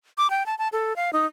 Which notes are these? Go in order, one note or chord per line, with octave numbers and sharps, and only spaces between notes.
D6
G5
A5
A5
A4
F5
D#4